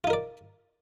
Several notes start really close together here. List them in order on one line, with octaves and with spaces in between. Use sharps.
F4 D#4 A#4 D5